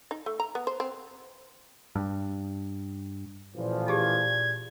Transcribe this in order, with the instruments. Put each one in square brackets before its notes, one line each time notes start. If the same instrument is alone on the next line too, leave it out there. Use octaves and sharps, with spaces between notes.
[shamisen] D#4
A3
A#5
B3
C5
C4
[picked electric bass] G2
[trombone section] A1 E3 F3 [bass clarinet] A#2
[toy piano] G4 G#4 A5 [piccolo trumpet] G#6